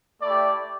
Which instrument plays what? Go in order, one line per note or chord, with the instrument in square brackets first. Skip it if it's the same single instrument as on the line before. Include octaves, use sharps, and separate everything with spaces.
[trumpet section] A3 E4 G4 D5